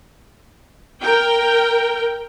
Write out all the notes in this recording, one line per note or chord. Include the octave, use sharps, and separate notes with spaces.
A#4 G5